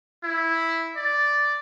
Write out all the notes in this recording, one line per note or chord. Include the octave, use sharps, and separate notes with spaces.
E4
D5